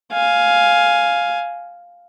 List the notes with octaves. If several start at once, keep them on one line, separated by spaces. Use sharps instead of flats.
F5 G#5